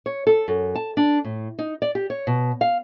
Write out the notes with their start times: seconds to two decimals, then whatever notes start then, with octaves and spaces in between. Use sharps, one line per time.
0.06 C#5
0.27 A4
0.48 F#2
0.75 A5
0.97 D4
1.24 A2
1.59 D#4
1.82 D5
1.95 G4
2.10 C#5
2.27 B2
2.61 F5